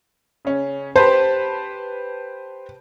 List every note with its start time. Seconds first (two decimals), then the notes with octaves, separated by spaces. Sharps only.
0.45 C#3 C#4
0.96 G4 B4 C5 A5